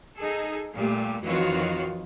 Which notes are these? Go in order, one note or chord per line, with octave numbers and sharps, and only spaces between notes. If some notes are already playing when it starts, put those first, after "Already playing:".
D#4 G#4 A4
A#2 G3 A3 G4
F2 D#3 E3 F4 F#4 C#5